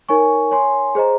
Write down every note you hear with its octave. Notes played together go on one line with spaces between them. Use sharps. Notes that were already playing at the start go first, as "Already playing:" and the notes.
D#4 A#4 C#5 G#5 C#6
C#5 G#5 C6
G#4 C5 D#5 A#5